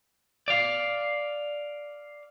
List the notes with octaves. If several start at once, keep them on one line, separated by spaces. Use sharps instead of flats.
D5 F5